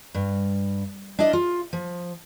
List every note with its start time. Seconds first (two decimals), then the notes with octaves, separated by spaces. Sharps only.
0.14 G2
1.19 D4 E4 D5 D#5
1.33 F4
1.73 F3